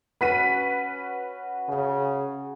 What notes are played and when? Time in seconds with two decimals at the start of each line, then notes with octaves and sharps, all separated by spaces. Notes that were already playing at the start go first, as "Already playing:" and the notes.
0.21 C#4 F#4 B4 B6 D#7
1.69 C#3